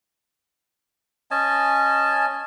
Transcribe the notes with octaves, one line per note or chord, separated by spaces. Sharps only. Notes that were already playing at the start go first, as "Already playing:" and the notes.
C#4 D#5 G#5 A5